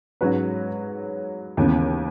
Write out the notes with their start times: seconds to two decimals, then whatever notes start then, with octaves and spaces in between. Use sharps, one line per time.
0.21 G#2 F#3 C#4 F#4 B4
1.57 D#2 C#3 E3 B3